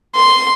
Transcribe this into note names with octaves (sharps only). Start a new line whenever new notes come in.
C6